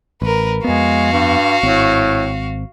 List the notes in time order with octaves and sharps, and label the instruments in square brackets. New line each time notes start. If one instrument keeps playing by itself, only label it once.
[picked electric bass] A1 [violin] A#4 B4
[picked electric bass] F2 B3 [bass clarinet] G#3 [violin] F#4 F5
[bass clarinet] G2
[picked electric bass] G#1 C4 [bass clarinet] A2